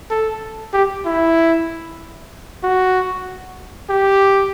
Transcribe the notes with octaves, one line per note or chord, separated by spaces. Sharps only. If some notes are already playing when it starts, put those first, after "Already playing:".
A4
G4
E4
F#4
G4